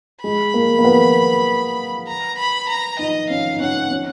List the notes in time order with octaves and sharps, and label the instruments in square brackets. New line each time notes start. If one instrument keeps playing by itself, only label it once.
[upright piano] G#3 [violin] B5
[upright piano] A#3
A#3
B3
[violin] A#5
B5
A#5
[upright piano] D#4 [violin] D#5
[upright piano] C#4 [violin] F5
[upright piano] D#4
[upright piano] C#4 [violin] F#5
[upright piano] C#4